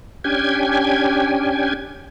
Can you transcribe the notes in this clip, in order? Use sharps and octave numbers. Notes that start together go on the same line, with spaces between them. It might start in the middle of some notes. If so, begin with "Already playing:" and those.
C#4 D4 G4 G5 G#5 G#6